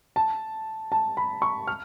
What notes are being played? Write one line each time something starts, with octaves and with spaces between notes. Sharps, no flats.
A5
A5
B5
C#6
F6